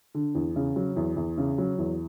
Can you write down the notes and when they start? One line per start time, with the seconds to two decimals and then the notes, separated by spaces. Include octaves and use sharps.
0.15 D3
0.35 E2
0.56 C#3
0.76 F#3
0.96 E2
1.16 E2
1.38 C#3
1.58 F#3
1.78 E2